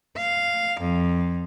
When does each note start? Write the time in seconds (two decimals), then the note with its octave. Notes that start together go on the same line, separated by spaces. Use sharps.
0.18 F5
0.80 F2